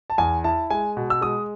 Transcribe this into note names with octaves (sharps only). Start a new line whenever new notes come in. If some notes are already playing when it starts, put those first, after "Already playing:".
A5
E2 G#5
E4 A5
G#3 G#5
B2
E6
G#3 D#6